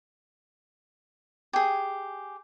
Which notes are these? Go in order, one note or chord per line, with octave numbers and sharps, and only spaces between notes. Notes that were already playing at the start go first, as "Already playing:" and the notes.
G4 G#4